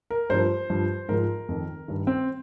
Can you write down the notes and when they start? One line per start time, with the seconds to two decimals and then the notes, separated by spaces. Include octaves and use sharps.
0.11 A#4
0.30 G2 F3 C5
0.70 G2 F3
1.09 G#2 F3 A#4
1.49 F2 D#3
1.88 G2 D#3
2.07 C4